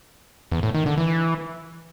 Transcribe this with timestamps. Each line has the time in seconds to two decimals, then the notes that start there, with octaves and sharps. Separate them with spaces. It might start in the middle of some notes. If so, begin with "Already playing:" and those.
0.52 E2
0.63 A2
0.75 D#3
0.86 D3
0.98 E3